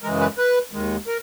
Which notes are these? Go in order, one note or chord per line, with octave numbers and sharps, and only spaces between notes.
F#2 C#3 E3 G#3 A#4
B4
B4
D#2 D#3 G#3
A#4